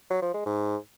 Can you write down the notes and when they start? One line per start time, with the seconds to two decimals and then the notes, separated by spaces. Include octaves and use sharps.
0.10 F#3
0.22 F3
0.34 G#3
0.46 G#2